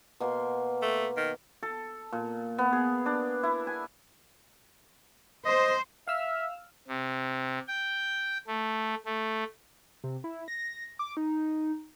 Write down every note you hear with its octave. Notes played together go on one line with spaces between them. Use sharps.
B2 A#3 C6
A3
D#3
A4
A#2
B3
G#4
D4
E4
G#5
C5 D#5
E5 F5 E6 F6
C3
G5
A3
A3
C3
E4
A#6
D6
D#4